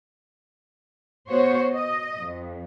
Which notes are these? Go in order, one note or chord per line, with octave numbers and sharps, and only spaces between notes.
B3 F#4 C5 C#5
D#5
F2